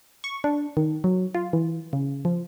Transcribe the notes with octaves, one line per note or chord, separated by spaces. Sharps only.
C#6
D4
D#3
F#3
F4
E3
C#3
F3